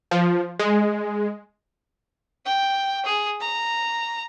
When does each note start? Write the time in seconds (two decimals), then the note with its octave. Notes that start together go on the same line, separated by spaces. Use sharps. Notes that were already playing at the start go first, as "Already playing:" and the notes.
0.11 F3
0.59 G#3
2.46 G5
3.06 G#4
3.41 A#5